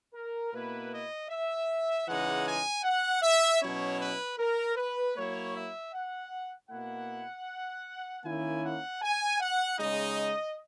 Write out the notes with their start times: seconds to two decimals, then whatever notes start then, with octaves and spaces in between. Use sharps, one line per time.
0.14 A#4
0.52 B2 A#3 E4 B4
0.91 D#5
1.29 E5
2.06 C#3 E3 G#3 D#4 F#5
2.45 G#5
2.83 F#5
3.22 E5
3.61 B2 F#3 C#4 E4 C#5
4.00 B4
4.38 A#4
4.76 B4
5.15 F#3 A#3 E4 C#5
5.54 E5
5.93 F#5
6.70 B2 A#3 E4 F#5
8.24 D#3 A#3 C#4 E4 G#5
8.62 F#5
9.02 G#5
9.40 F#5
9.78 C#3 G#3 D#4 D#5